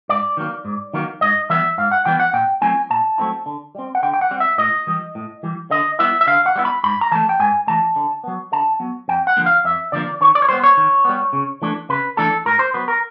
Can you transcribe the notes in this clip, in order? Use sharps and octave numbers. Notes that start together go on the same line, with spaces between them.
G#2 D5
D#3 F#3 A#3
G#2
D#3 F#3 A#3
G#2 D#5
E3 G3 B3 E5
G#2 F5
F#5
E3 G3 B3 G5
F#5
A#2 G5
F#3 A3 C4 E4 G#5
A#2 A5
F#3 A3 C4 E4
D3
G3 C4
F#5
D3 G5
G5
F#5
G3 C4
E5
A2 D#5
E3 G3
A2
E3 G3
D3 D#5
G3 B3 E4 E5
E5
D3 F5
F#5
G3 B3 E4
B5
G#2 B5
A#5
E3 A3 A5
G5
G#2 G#5
E3 A3 A5
D3
F#3 B3
D3 A5
F#3 B3
F2 G5
F#5
D3 F3 A#3
F5
F2 E5
D3 F3 A#3 D5
D#3 C#5
D5
C#5
G3 B3 C5
C#5
D#3
G3 B3
C#3
E3 A3 D4
C#3 B4
E3 A3 D4 A4
A2 A#4
C5
F#3 B3 B4
A#4